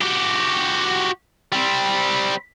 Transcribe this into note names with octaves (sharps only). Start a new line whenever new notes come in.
F#4 G4
G3 C4